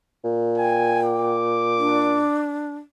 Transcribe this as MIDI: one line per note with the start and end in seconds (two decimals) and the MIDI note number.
0.24 2.26 46
0.58 1.32 79
0.58 1.00 80
1.06 2.47 86
1.78 2.75 62